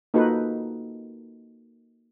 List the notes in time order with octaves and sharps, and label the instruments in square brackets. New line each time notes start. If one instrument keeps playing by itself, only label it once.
[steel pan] A#3 D#4 F4 F#4 A4 B4